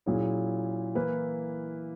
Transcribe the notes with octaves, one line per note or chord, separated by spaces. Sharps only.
A#2 F#3 C#4 E4 G#4
E3 A#3 E4 B4